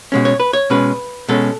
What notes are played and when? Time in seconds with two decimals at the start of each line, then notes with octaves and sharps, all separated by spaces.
0.12 B2 G#3 C#4
0.25 C#5
0.40 B4
0.53 C#5
0.70 B2 G#3 C#4 B4
1.29 B2 G#3 C#4 A4